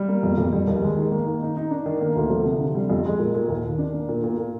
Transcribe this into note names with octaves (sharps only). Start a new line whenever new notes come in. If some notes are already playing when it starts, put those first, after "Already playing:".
Already playing: G3
A#3
F2
F2
G3
D#2
G#3
D#3
A#3
D#3
D#4
D#4
D4
D#3
A#3
D2
F3
C3
D3
G3
F2
G#3
A#2
A#2
D#2
D#2
D4
A#3
A#2
A#2
A#2